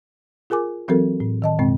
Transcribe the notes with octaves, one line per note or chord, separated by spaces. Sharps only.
F4 G#4 A#4 G#5 D6
E3 F#3 C4 F#4 A4 A#4
A2
D#3 D#5 A5
F#2 B2 G#3 C4